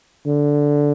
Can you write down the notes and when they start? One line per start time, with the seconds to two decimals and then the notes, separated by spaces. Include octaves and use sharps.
0.26 D3